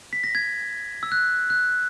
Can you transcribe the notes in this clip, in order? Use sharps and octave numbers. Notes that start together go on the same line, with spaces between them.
B6
A#6
G#6
E6
F#6
F#6